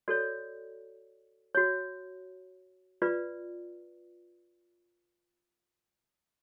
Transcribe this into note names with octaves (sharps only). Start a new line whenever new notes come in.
F#4 A4 C#5 D5
F#4 C#5
F4 B4 D5